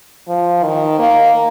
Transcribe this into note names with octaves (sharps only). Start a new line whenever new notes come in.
F3
D#3
A#3